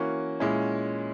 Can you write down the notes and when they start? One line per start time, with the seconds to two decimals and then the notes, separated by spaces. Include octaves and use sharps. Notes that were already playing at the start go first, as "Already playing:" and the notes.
Already playing: E3 A#3 C#4 F#4
0.40 A#2 G#3 C#4 E4